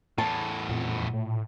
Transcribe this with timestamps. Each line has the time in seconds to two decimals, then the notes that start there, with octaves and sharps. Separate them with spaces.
0.18 E2 A2 A5
0.69 F2 A#2
1.13 A2